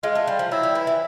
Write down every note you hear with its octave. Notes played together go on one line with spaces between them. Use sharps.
G#3 F4
A3
G3
F3
F#3 E4
G3
E3
E3